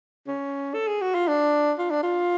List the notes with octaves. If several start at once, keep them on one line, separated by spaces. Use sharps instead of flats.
C#4
A4
G#4
F#4
F4
D4
F4
D4
F4